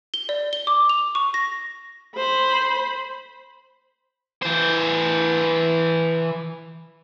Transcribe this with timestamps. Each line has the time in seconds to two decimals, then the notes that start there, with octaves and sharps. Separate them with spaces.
0.14 G7
0.29 D5
0.53 G7
0.67 D6
0.89 F7
1.15 C#6
1.34 A#6
2.17 C5 B5
4.42 E3 C5